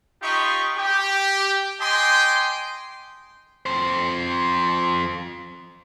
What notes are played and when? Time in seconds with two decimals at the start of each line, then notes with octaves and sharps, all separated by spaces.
0.23 D#4 F4 G4 D#5 B5 C#6
0.77 G4
1.80 G4 D#5 G5 G#5 C6
3.66 F2 C5